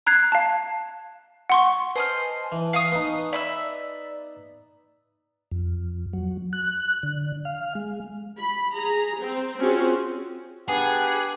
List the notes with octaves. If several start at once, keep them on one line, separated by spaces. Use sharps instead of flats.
A#5 F#6 G#6 C7
F5 A5
F#5 C6 C#6
B4 C5 D#5 G#5 A5 F6
E3
F5 C#6 D#6
B3 D#4
D5 E5 B5 E6
F2
F#3
F#6
D3
F5
G#3
B5
G#4 A#5
C4
C4 C#4 F4 F#4 G#4
B3 D4 G4 G#4 F#5